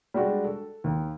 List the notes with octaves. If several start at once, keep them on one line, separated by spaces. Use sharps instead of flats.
G3 G#3 D4 F#4
A4
D#2